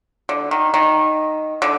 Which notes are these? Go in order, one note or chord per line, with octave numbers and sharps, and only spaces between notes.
D3
D#3
D#3
D3